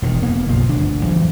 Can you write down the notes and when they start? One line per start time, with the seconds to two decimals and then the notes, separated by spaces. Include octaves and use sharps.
0.02 E1 D#3
0.22 F1 A#3 B3
0.47 F#1 B1 F3
0.69 G1 D2 D4
1.05 F2 E3 F#3